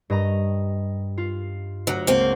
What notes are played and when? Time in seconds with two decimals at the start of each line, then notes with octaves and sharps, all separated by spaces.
0.10 G2 D#5 A#5
1.18 F4
1.87 D2 F#3 F#5 A#5
2.07 C#2 A#3 C4